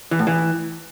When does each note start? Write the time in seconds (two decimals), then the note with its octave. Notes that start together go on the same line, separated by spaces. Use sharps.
0.11 E3
0.19 A2
0.27 E3